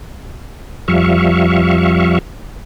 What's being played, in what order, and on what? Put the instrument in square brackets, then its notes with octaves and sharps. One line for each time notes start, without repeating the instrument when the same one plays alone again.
[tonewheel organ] F2 F3 G3 E5 F5 C#6